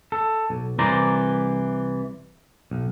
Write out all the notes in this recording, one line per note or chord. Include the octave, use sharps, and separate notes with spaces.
A4
B1
C2 E3 C5 D5 A#5
B1